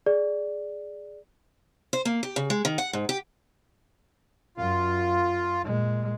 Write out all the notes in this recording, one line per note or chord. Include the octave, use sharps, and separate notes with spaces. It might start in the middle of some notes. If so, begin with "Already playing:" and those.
G#4 D5
C5
A#3
G4
C#3
G#3
D#3
F#5
G#2
G4
F#2 F4
A#2 G#3